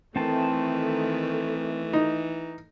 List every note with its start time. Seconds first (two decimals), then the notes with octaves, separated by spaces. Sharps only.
0.16 D#3 E3 A3 C4 A5
1.93 D#4